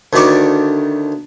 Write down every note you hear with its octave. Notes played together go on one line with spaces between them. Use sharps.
D2 D#3 D5 C#6